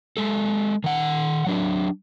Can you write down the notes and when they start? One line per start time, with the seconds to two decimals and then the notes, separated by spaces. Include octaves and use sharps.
0.17 G#3 A4
0.84 D#3 F#5
1.47 F#3 D4